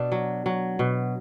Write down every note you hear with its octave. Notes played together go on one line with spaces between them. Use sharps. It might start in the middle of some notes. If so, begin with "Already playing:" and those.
Already playing: B2 D4
F#3
F#3
B2